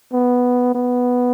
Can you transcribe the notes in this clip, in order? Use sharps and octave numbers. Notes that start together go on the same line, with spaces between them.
B3
B3